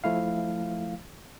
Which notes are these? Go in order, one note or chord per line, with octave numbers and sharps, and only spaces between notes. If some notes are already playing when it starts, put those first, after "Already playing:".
F3 A3 E4 F5